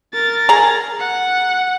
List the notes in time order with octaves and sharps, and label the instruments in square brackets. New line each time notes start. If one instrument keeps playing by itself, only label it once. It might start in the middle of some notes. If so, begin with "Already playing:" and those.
[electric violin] A#4 A6
[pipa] G#4 A#5
[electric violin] F#5